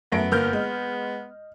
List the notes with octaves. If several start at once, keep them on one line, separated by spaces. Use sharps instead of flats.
F#2 A3 B3 A#6 D7
G1 A#3 F6 G6
G#3 D#5